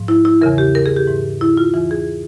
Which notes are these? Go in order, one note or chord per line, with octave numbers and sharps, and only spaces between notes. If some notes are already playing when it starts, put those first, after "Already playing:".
Already playing: G#2 F3
E4
E4
E2 C#3 E3 A#4
G4
A#4
G#4
G4
G#2 E3
E4
F4
E2 E3 F4
G#4